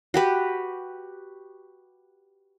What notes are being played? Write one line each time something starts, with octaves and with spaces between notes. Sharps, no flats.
F#4 G4 B4